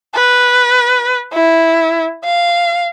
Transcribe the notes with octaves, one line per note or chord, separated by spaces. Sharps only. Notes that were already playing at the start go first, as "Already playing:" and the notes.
B4
E4
F5